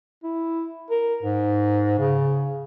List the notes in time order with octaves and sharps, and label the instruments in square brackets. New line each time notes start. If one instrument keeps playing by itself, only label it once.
[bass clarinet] E4
A#4
G#2
C#3